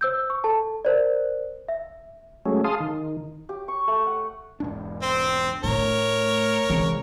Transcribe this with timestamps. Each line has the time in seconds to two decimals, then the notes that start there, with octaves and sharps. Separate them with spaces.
0.01 C5 E6 G6
0.30 C#6
0.44 A4 A5
0.85 A#4 C5 D5
1.68 E5
2.46 F#3 G#3 A3 C#4
2.64 G#4 F5 A5 C6 D#6
2.80 D#3
3.49 G4
3.68 C#6
3.87 A3
4.06 F#5
4.60 E1 G#2 D4
5.02 C4 C5
5.64 A2 A3 D4 A#4 C#5
6.70 C2 E3 G#3 C4